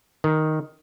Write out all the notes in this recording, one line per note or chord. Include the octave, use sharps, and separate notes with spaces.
D#3